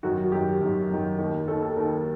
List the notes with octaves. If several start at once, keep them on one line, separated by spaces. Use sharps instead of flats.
F#2 D#3 F#4
F#4
F#2 D#3 G4
F#2 D#3
F#2 D#3
D#2 D#3
D#2 D#3 A4
A4
D#2 D#3 A#4